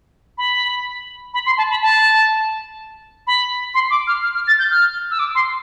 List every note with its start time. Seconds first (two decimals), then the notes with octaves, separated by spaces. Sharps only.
0.38 B5
1.34 B5
1.46 C6
1.58 A5
1.70 B5
1.82 A5
3.27 B5
3.74 C6
3.90 D6
4.07 F6
4.23 F6
4.35 F6
4.47 A6
4.59 G6
4.71 F6
5.11 E6
5.19 D6
5.35 C6